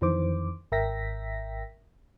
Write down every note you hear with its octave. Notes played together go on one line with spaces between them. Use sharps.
F2 D#3 E3 C5 D6
G#1 A#4 E5 G5 A#6 B6